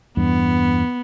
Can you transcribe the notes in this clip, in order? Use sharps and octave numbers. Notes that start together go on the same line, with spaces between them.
E2 G2 B3